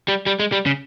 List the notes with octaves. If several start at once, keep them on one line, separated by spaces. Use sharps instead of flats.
G3
G3
G#3
G3
C#3